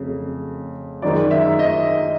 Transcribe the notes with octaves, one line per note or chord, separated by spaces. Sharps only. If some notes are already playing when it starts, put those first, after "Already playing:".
Already playing: F2 C#3 F#3 A3
F#2 D#3 G#3 D5
E5
D#5